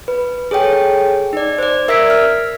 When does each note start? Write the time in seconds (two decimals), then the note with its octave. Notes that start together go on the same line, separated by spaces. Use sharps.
0.08 B4
0.51 G#4 A4 C#5 G5
1.33 D#4 D5
1.58 C5 D5
1.88 A#4 E5 E6 G#6 B6 D7
2.10 F6